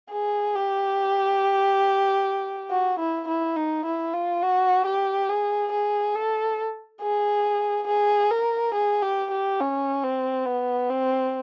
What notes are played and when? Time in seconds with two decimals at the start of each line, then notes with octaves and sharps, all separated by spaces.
0.11 G#4
0.55 G4
2.70 F#4
2.99 E4
3.28 E4
3.56 D#4
3.85 E4
4.14 F4
4.43 F#4
4.86 G4
5.29 G#4
5.72 G#4
6.15 A4
7.01 G#4
7.87 G#4
8.31 A#4
8.74 G#4
9.02 G4
9.31 G4
9.60 C#4
10.03 C4
10.46 B3
10.89 C4